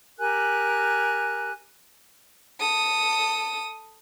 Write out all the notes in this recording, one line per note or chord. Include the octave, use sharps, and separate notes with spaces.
G4 A#4 G#5 F#6
A4 D#6